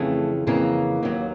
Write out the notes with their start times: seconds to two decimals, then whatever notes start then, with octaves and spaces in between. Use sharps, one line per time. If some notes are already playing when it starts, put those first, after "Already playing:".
Already playing: F2 C#3 E3 A3
0.47 F2 C#3 E3 A#3
1.03 D#2 D#3 F#3